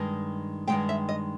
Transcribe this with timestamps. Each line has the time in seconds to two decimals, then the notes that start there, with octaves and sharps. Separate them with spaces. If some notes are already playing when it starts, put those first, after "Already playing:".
Already playing: G2 D#3 G#3
0.68 G2 D#3 G#3 G5
0.89 E5
1.09 D#5